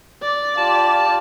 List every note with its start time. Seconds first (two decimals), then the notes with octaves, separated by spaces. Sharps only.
0.22 D5
0.58 F4 G4 A5